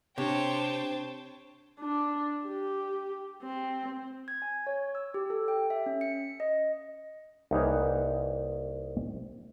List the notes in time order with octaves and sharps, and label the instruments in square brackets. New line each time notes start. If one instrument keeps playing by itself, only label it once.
[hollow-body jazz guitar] C3 [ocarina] D4 [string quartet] C5 G5 A5 [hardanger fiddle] C#5
[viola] D4
G4
C4
[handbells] G#6
G#5
C#5
E6
G4
A4
G5
E5
C#4
C#7
D#5
[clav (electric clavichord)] C2 A#3 D#4 G#4 B4 C#5